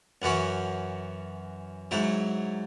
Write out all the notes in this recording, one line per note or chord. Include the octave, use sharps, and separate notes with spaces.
F#2 E3 C#4 F#4
G#2 F#3 E4